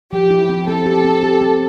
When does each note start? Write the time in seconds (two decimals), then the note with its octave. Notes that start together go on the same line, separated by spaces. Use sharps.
0.13 F3 G4
0.30 E4
0.49 C4
0.68 C4 A4
0.86 G4
1.04 C4
1.23 G4
1.41 C4